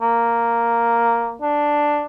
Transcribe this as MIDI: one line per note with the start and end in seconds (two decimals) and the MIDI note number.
0.02 1.34 58
1.42 2.04 62